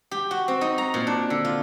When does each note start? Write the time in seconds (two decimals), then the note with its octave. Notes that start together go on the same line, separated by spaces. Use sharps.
0.11 G4
0.31 F#4
0.48 C4
0.61 D#4
0.78 A#5
0.94 A#2
1.07 D4
1.30 D3
1.45 F4